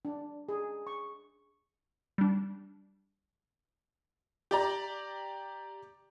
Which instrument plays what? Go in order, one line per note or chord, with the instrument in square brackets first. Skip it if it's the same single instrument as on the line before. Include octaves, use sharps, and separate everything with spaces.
[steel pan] D4
G#4
C#6
[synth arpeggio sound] G3 D4
[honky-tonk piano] G4 D5 A#5